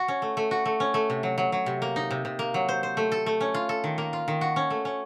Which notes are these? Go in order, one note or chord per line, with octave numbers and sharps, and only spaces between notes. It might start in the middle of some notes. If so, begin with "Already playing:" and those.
Already playing: F#4
C#4
A3
A3
F#4
A3
C#4
A3
C3
F#3
F#3
F#3
C3
A#3
D#4
C3
C3
A#3
F#3
C5
C5
A3
A4
A3
C#4
F4
A4
D#3
A#3
F4
D#3
F#4
C#4
A3
C#4